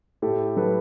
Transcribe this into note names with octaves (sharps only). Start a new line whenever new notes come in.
A2 G4 A4
F#3 A4 B4